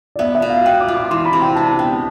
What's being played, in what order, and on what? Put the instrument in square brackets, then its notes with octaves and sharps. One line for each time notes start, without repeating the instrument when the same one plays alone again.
[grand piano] D5
[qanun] B3 [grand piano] E5
[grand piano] E5
[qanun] B2
[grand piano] F5
[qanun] B4 [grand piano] G5
[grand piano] D6
[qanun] F4
[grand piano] D6
[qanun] E3 [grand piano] C6
[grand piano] B5
[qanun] C3
[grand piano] G5
[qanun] D4 [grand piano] A5
[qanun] B3 [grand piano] G5